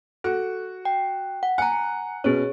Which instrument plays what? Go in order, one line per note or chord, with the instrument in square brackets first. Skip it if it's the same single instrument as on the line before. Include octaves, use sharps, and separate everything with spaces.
[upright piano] F#4 [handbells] A4
[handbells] G5
F#5
[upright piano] F#5 [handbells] G#5 A#5
[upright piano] B2 C#4 [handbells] G#4 C#5